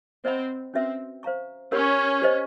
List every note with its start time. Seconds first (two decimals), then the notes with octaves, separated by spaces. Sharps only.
0.25 C4 C5 D#5 F#5 B5
0.74 C4 C#4 F#4 B4 E5
1.23 C5 F5 A#5 C#6
1.72 C#4 G4 A#4 C#5 F#5 B5
2.22 G4 C5 D#5